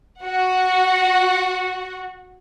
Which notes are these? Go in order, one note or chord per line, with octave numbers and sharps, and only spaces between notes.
F#4 F#5